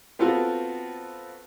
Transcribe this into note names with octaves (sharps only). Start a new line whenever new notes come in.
B3 C4 F4 F#4 A4